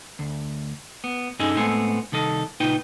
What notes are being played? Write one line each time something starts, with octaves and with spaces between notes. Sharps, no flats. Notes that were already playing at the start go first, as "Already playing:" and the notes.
D2
B3
G2 C#4 D#4 G#4 A4 D#5
A2 G#3 B3 C4 A4 G#5
C2 D#3 A4 D#5
C#2 A#2 D#4 B4 G5